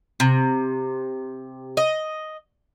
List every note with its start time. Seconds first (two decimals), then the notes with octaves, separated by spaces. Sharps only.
0.20 C3
1.77 D#5